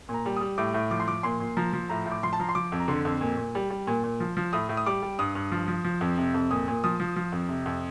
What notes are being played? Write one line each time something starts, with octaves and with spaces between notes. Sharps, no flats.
A#2
A#5
G3
G3 D#6
A2 D6
A2
F3 D6
C6
F3 D6
A#2 C6
A#2
F3 A#5
F3
A2 A#5
A2
D6
F3 C6
A5
F3 A#5
C6
F3 D6
F2
A#5
D3 C6
F2
A#2
A#2
G3
G3
A#2
A#2
F3
F3
A2 D#6
A2
D#6
G3 D6
G3
G2 D#6
G2
F3
F3
F3
F2
C3
F2
A#2 D#6
A#2
F3 D#6
F3
F3
F2
C3
F2